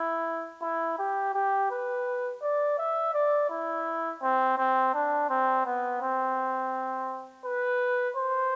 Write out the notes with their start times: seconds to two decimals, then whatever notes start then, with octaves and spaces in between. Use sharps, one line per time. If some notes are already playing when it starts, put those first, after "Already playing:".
Already playing: E4
0.62 E4
0.99 G4
1.34 G4
1.71 B4
2.42 D5
2.78 E5
3.14 D5
3.50 E4
4.22 C4
4.58 C4
4.94 D4
5.30 C4
5.65 B3
6.01 C4
7.45 B4
8.16 C5